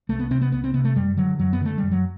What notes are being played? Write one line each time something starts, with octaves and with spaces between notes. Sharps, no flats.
C2 A3
B3
C3 C4
B3
C2 B3
C4
C3 B3
A3
F#2 G3
D3 F#3
F#2 F#3
B3
D3 A3
F#2 G3
F#3